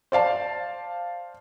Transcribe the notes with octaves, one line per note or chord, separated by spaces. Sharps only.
C5 D5 F5 A5